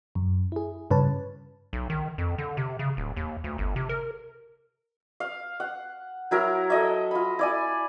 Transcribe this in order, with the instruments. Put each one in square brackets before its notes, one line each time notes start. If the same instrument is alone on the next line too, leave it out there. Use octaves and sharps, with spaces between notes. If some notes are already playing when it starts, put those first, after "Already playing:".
[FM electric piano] F#2
E4 G#4
G2 C#3 B4 C#5 A5
[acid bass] B1
D#3
F2
D3
C3
C#3
D1
D#2
D2
G1
C3
A#4
[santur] F5
F#5
F#3 E4 A#4
A4 D#5 E5
F4 B5
E4 D5 G#5